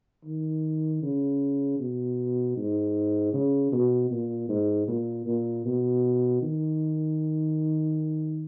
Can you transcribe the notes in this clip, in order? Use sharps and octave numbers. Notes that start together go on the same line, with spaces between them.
D#3
C#3
B2
G#2
C#3
B2
A#2
G#2
A#2
A#2
B2
D#3